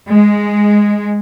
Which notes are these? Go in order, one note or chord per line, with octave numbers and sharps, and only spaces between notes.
G#3